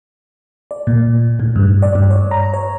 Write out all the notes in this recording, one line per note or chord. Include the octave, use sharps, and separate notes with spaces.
D5
A#2
A2
G2
D5
G2
C#5
A#5
C#5